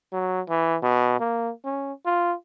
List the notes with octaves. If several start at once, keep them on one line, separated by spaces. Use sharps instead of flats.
F#3
E3
B2
A#3
C#4
F4